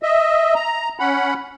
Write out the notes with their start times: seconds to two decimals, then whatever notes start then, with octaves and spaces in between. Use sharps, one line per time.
0.02 D#5 E5
0.55 A#5
0.99 C#4 F#5 B5